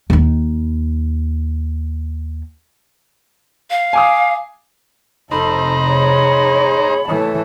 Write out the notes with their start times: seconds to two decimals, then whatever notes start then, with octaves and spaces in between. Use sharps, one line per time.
0.10 D#2 D#4
3.71 F5
3.93 G#5 D6 D#6
5.31 F1 C3 D#4 A4 C5 A#5 B5
5.87 G#4 C#5
7.08 E3 A3 C#5 A5